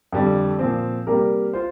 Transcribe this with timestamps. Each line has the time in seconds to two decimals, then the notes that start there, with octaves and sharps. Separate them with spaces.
0.12 F2 D3 G3
0.59 A#2 F3 C4
1.07 C3 G3 A#3 G4 A#4
1.53 F4 C5